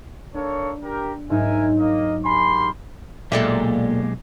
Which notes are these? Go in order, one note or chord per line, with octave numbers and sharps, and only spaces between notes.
A#3 D4 A4 C#5
G4 A#4
G#2 F#3 D#4 A#4 E5 G#5
A#3 D#5
A#3 G4 G#5 B5 C6 F6
B1 A#2 G#3 A#3 G4 A4 D5 E5